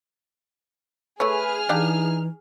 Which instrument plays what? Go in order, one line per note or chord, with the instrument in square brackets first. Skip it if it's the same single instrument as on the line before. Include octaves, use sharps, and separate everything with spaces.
[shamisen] A3 E4 C#5 [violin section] G#4 F6 [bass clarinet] B4
[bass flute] E3 [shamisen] D4 G4 F5 [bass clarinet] D#4